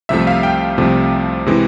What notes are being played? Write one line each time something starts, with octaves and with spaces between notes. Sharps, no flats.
C2 C3 F3 A3 E5
F5
G5
C2 C3 F3 A3
C3 E3 G#3